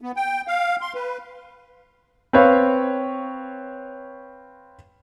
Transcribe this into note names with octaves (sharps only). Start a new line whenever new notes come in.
B3
G5
F5
C6
B4
C4 B4 C#5 F5